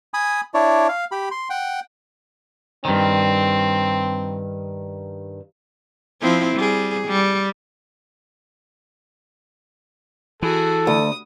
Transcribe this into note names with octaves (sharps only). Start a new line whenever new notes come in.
G#5 B5 D#6
D4 E4 C#5 D5
F5
G4 B5
C6
F#5 G5
G2 D#3 C4
F3 C4 E4
G3 G#4
G3
E3 F#4 G#4 A4
D2 D#6